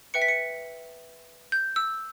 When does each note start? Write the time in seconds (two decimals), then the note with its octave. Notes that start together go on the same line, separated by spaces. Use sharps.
0.14 B4 E5 G5 C#7
0.22 B6
0.28 C#7
1.52 G6
1.76 E6